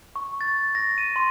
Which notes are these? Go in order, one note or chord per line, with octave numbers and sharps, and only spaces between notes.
C#6
A6
A#6
D#7
C6